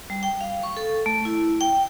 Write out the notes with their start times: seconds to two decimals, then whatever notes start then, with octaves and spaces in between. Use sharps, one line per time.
0.10 G3
0.23 G5
0.41 F5
0.63 C#6
0.77 A4
1.06 A3
1.25 E4
1.61 G5